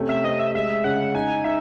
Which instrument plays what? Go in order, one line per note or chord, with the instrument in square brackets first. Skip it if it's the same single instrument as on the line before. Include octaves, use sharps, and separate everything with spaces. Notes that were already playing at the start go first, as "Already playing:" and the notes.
Already playing: [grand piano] C3 A3 C#4
[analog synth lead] E5
[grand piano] C4 [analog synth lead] D#5
[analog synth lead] E5
[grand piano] G#3 [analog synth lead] E5
[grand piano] C#3 [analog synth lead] F#5
[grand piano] D#4 [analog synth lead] G#5
[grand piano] D#4 [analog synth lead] E5